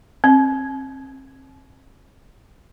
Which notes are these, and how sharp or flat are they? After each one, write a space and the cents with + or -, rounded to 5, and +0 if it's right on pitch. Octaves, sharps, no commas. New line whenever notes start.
C4 +40